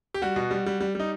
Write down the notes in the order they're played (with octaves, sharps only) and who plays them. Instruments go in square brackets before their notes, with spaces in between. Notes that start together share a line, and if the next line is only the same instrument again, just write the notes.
[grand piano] G4
G3 F#4
B2
G3
G3
G3
G3 D#4